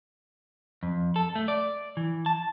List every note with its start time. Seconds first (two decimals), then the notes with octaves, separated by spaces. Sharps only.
0.83 F2
1.16 A4
1.35 A3
1.48 D5
1.97 E3
2.26 A5